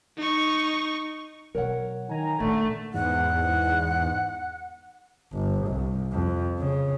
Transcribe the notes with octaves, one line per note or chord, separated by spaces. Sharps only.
D#4 C#6
B2 F#3 A#4 C#5 F#5
D#3 G#5 A#5
A#2 D3 D#3 A3
E2 G#2 F#5
G1
C2
F2
C#3